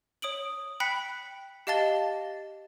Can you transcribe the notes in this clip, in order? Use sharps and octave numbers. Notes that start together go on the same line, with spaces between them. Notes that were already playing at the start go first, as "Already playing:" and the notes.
C#5 D#6 D7 F#7
G5 B5 F#6 B6 C#7
G4 D#5 F5 A5 A6 G7